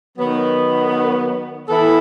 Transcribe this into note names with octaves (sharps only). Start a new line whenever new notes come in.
D#3 F#3 B3
E3 B3 E4 A4